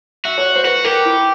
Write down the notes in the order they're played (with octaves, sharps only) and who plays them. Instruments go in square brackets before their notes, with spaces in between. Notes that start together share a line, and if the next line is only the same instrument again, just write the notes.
[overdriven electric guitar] F#4 [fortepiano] E5
[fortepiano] C#5
C5
[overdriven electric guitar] F#4 [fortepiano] B4
[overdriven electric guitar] G4 [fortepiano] A#4
[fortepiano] E4